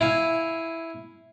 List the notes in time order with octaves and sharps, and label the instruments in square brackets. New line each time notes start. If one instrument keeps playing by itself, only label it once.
[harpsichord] E4 F5 G#5